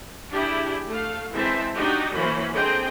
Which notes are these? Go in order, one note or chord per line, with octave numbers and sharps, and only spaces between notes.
D4 E4 G4 G#4
A3 F5
E3 G#3 C4 C5 E5 A5
D4 D#4 F#4 G4 D#5
E3 F#3 A#3 C#4 C5 B5
D3 C4 G#4 D#5 G5